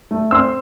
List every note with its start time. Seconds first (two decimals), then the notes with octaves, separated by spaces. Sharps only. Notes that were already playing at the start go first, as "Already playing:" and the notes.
0.11 A3
0.31 C4 C6 E6